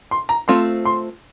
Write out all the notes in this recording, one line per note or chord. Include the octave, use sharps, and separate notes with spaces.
C6
A#5
A3 C4 F4 C6
C6